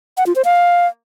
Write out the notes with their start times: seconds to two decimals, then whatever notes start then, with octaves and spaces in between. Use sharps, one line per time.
0.17 F#5
0.27 F4
0.36 C5
0.45 F5